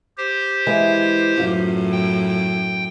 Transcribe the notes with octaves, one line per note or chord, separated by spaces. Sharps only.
G4 C5
E3 G#3
F#2 A2 F4
G5